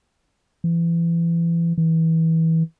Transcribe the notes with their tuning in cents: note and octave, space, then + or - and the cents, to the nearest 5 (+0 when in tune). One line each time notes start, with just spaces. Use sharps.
E3 +30
E3 -25